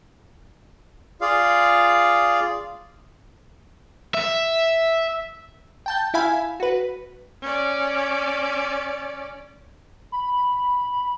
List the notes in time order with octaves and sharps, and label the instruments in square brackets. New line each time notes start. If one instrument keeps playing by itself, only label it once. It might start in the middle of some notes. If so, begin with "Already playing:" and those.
[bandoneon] F4 G#4 D5 F5
[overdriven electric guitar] E5
[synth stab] G5 A5 G6
E4 E5 F5 G#5 B5
F#4 B4
[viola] C#4 D5
[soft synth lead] B5